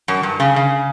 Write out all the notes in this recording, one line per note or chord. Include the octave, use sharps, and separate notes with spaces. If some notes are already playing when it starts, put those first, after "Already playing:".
F#2
G2
C#3
C#3